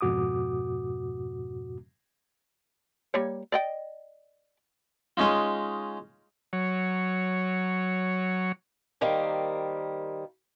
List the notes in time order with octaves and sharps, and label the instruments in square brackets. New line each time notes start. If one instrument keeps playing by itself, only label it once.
[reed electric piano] F2 G#2 B2 F#4 D6 D#6
[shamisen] G3 A#3 C#5
D5 D#5 G5
[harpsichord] G#3 C#4 D#4 F4
[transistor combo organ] F#3 C#5
[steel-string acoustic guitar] D#3 G3 A#3 C5